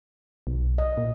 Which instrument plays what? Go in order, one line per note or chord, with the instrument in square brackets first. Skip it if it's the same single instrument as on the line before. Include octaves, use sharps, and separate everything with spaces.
[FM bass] B1
[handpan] D#5
[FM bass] A#2